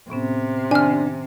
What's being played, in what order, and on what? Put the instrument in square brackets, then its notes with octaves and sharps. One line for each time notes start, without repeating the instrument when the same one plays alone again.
[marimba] A2 B3 C#4 [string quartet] C3
[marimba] D#3 C#4 [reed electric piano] D4 [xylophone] G#5 F6